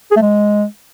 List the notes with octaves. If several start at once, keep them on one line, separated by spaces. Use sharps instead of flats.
G#4
A3
G#3